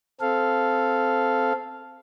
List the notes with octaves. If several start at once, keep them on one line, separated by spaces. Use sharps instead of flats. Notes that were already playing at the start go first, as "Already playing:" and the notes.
C4 A4 F5